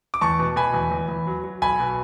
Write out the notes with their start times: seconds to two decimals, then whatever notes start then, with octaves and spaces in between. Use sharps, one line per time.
0.14 D6
0.21 E2 A5 C#6
0.39 B2
0.56 B2 G#5 B5
0.74 E2
0.91 E2
1.09 E2
1.27 F#3
1.44 F#3
1.62 B1 G#5 B5
1.80 B2